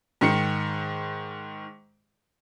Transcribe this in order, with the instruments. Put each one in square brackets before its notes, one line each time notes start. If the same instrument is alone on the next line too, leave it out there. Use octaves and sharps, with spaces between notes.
[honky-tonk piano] G#2 D#3 C#7